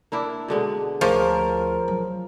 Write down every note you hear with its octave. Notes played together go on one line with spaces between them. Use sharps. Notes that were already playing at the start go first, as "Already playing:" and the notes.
A#3 D4 E4
B2 D3 G#3
D2 F3 C#4 G#4 A#4 C5 F5
F#3